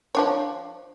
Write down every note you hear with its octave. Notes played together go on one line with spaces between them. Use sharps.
F3 D4 C#5